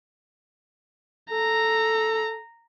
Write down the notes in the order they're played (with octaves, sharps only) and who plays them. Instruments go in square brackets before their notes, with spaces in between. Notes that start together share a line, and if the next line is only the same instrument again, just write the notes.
[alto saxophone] A4 [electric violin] A#5